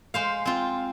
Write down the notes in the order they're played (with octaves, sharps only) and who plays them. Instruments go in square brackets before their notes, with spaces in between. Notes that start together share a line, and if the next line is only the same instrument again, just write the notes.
[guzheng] G#3 C5 F5
C4 F4